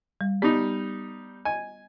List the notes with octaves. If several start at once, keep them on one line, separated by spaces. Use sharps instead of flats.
G3
G3 B3 D#4
D#5 G#5